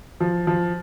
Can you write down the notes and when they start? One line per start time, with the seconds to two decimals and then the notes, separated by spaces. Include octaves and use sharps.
0.20 F3
0.47 F3